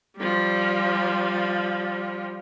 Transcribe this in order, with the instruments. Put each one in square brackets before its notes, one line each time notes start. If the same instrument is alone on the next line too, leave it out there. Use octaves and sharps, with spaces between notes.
[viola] F3 G3